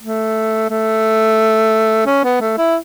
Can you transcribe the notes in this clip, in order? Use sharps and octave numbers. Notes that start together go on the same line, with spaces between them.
A3
A3
C#4
B3
A3
E4